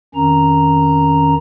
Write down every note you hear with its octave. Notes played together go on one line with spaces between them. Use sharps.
F2 D#3 C#4 A#5